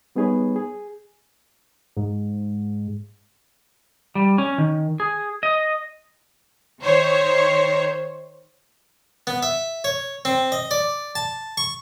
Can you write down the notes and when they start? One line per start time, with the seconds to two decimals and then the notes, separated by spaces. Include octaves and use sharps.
0.16 G3 B3 D#4 G#4 B4 C#5
0.56 G#4
1.97 G#2
4.15 G3
4.38 C#4
4.58 D#3
5.00 G#4
5.43 D#5
6.82 D#3 C5 C#5
9.27 B3
9.43 E5
9.84 C#5
10.25 C4
10.52 D#5
10.71 D5
11.15 A5
11.57 C#6